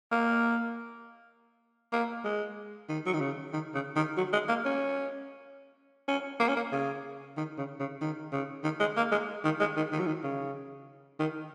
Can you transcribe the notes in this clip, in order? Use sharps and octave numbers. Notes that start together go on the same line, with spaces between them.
A#3
A#3
G#3
D#3
F#3
D#3
C#3
D#3
C#3
D#3
F#3
G#3
A#3
C#4
C#4
A#3
C#4
A#3
C#3
D#3
C#3
C#3
D#3
C#3
D#3
G#3
A#3
G#3
D#3
G#3
D#3
D#3
F#3
D#3
C#3
D#3